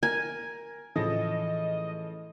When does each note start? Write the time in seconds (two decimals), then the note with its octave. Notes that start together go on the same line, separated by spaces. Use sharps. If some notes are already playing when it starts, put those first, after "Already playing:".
0.03 A#4 G#5
0.96 A2 C#3 E3 F3 A4 D#5